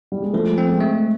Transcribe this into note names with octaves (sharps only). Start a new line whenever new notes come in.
G3
G#3
F3 A3
C4
G#3
A3